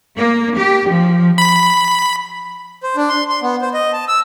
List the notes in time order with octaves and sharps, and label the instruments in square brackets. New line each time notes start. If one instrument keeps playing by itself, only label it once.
[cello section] A#3
G4
F3
[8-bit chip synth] B5
[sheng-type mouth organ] C5
D4
C6
C6
B3
C5
D#5
A5
E6